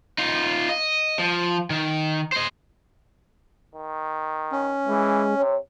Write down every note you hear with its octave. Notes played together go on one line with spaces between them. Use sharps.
D#4 F4
D#5
F3
D#3
C5 D#5
D#3
C#4
E3 G#3
C3 C#5